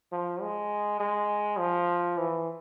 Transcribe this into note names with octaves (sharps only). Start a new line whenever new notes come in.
F3
G#3
G#3
F3
E3